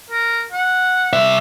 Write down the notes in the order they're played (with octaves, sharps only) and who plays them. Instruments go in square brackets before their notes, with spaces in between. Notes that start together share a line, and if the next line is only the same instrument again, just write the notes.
[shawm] A#4
F#5
[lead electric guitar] C2 E5